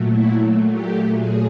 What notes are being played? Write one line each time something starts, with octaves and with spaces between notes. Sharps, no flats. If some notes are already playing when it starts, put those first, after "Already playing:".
Already playing: A#2 F#3 A3
E4
G4
G#4